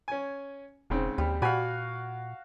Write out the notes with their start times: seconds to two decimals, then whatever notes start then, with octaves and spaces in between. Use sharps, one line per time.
0.08 C#4 G#5
0.90 E1 G#2 C#3 C4
1.18 D#2 G3
1.42 A#2 F#4 D5 F5 G#5 B5